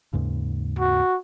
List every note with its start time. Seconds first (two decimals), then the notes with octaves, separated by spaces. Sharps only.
0.13 D#2 G#2 C#3
0.79 F#4